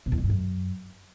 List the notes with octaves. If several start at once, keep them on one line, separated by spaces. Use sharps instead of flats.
B2
E2
D3
G2
F#2